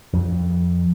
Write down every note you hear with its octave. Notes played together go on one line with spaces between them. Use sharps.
F2